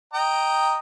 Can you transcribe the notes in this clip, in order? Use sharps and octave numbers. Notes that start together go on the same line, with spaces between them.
D#5 G5 A#5